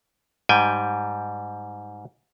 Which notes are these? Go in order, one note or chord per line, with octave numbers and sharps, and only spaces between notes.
G#2 G3 G5 G#5